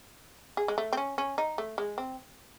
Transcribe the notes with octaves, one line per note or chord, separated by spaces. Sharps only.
G#4
G#3
A3
C4
C#4
C#4
D#4
A3
G#3
C4